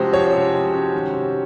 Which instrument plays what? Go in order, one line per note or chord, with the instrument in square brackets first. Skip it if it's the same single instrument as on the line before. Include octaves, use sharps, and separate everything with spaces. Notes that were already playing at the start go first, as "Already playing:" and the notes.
Already playing: [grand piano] C3 F3 G#3 C#4 [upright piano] F#4 G4 C5
[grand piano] F3 [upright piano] C#5
[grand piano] C3
G#3
C#4
D#3
C3